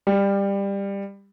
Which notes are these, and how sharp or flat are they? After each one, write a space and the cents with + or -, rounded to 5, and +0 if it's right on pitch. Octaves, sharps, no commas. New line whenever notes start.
G3 +20